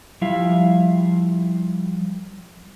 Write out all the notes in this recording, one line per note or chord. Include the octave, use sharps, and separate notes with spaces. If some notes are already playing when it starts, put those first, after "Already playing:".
F3 G3 E4 E5 F5